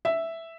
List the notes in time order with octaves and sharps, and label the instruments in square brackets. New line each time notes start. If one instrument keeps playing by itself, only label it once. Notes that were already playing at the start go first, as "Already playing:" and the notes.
[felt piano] E5